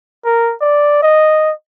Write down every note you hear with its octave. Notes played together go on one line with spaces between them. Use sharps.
A#4
D5
D#5